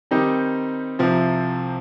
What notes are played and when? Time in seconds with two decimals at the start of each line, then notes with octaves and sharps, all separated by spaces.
0.11 D#3 G3 C4 D#4 G4
0.99 C2 C3 F3 C4